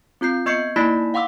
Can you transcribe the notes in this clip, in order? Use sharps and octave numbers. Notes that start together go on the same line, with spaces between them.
C4 F4 G6 C7
B3 D#5 C#6 G6 C7 C#7
A#3 D#4 E4 D5 B5 B6
F5 F#5 C6 D6 E6